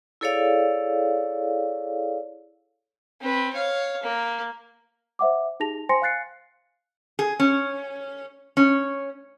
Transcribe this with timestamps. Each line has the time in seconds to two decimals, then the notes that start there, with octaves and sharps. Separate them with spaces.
0.21 E4 G#4 A4 C#5 D5 F5
3.20 C4 B4
3.53 C#5 F5
4.03 A#3
5.19 C5 E5 F#5 D6
5.60 D#4 G4 G#4 A5 A#6 F7
5.89 C5 G5 G#5 C6 A#6 C#7
6.02 F5 G#5 F#6 A6 C7 C#7
7.19 G#4
7.40 C#4
8.57 C#4